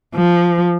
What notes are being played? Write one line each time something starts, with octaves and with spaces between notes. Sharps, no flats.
F3